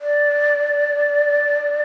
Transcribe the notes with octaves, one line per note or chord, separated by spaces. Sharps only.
D5